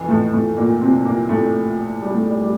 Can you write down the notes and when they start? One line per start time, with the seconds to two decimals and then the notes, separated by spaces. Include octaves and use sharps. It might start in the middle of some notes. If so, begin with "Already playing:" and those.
Already playing: F2 C3 E3
0.08 A2 A3
0.33 A2 A3
0.57 A#2 A#3
0.81 C3 C4
1.05 A#2 A#3
1.29 A2 A3
2.02 G3
2.14 A3
2.26 G3
2.41 G3